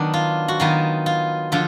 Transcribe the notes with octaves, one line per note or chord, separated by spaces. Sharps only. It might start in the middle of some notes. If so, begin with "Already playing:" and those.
Already playing: D#3 F#3 B3 D4
F4
F#4
D#3 F#3 B3 F4
F4
D3 F3 F4